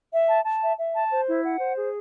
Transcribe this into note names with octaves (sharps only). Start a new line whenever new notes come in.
E5
A5
A5
E5
E5
A5
C5
E4
F#5
C5
G#4